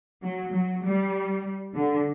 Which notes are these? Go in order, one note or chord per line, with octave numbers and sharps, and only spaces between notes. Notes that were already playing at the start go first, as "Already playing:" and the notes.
F#3
F#3
G3
D3